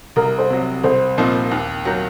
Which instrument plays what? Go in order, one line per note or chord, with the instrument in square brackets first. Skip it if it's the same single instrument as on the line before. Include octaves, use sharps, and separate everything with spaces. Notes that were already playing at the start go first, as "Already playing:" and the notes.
[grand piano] C2 [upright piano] A#4
[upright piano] C5
[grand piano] C3 F#3
[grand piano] C2 [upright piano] C5
[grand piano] A#2 F3 C4 D#4
D#2
D#3 F#3